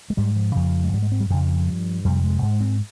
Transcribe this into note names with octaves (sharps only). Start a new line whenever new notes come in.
G#3
G#2 G3
F3
F2 C#3 F3
G#3
G#2 G3
G#3
C4
G3
F2 C#3 F3
G2
F2 C3 G3
G#3
G#2 G#3
C4